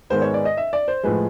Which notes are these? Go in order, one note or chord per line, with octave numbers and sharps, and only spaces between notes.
G#2 D#3 G#3 B3 C5
C#5
D5
D#5
E5
D5
C5
A2 F3 G#3 B4